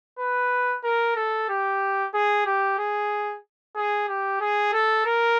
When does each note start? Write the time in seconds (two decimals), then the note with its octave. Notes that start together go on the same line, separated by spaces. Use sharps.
0.19 B4
0.84 A#4
1.16 A4
1.49 G4
2.14 G#4
2.46 G4
2.78 G#4
3.76 G#4
4.08 G4
4.40 G#4
4.73 A4
5.06 A#4